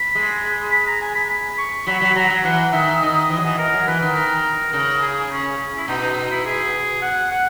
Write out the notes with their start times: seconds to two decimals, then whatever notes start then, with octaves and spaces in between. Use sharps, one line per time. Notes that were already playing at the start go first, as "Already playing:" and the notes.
Already playing: B5
0.15 G#3
0.72 B5
0.87 A#5
1.01 G#5
1.15 B5
1.30 B5
1.58 C#6
1.87 F#3 B5
2.01 F#3
2.16 F#3 A#5
2.30 F#3
2.44 E3 F#5
2.73 D#3 E5
3.02 D#3 D#5
3.30 E3
3.37 F#3
3.45 E3
3.59 A#4
3.73 F#3
3.88 E3 B4
4.02 D#3
4.16 A#4
4.73 C#3 A#4
5.02 G#4
5.31 C#4
5.77 E4
5.88 B2 D#4
6.03 D#4
6.17 D#4
6.31 E4
6.46 G#4
7.02 F#5
7.32 F#5